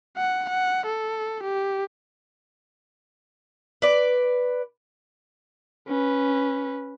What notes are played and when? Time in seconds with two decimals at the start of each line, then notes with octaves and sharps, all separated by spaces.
0.18 F#5
0.50 F#5
0.87 A4
1.44 G4
3.82 B4 D5
5.87 C#4 B4